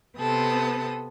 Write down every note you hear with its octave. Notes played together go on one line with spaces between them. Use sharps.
C3 B3 C4 A4 D#6